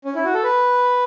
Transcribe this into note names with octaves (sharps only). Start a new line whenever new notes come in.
C#4
E4
F#4
A4
B4